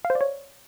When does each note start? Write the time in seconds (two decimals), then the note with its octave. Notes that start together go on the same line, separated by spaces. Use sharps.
0.05 F5
0.10 C5
0.15 D5
0.21 C#5